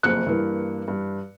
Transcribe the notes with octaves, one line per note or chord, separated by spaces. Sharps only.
F#1 F2 F#6 C#7
G2 E3 A#3
G2